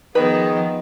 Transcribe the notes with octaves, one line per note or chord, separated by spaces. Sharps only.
D#3 F3 B3 G#4 B4